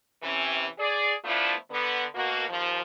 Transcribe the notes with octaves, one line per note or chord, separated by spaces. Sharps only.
C3 E3 C#4
G#4 D5
F3 A3 B3 D4 E4 F4
D3 B3
B2 A#3 F#4
D#2 F3